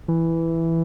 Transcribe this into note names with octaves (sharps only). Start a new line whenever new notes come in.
E3